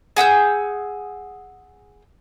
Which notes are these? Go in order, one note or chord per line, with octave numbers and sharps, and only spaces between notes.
G#4 F#5 E6 G6